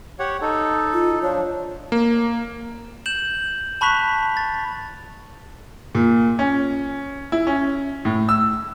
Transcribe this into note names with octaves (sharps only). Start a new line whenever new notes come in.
G4 C#5 F#5
D#4 A4
F4
F3 D4 C#5
A#3
G6 E7 F#7
A5 B5 C#6 F#6 B6 F7
A6
A#2
C#4
E4
C#4
A2
E6